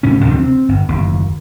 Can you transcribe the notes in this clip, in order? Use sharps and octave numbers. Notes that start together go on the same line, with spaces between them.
D1 A2 C#3 C#4
D2 C3 F3 D4
C4
G1
F#1 D#2